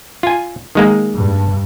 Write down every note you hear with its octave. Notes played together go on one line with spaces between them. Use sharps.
F4 G#5
D#3 G#3 A#3
G2